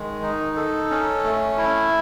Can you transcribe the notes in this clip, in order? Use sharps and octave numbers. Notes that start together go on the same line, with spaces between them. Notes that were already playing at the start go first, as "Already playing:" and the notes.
Already playing: D#3 G#3
D#4
A4
C#4
A3
E4